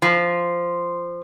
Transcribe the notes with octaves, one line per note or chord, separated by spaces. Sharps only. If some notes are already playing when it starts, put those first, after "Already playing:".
F3